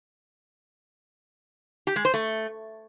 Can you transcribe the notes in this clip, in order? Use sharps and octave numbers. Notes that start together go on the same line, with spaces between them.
G4
G#3
C5
A3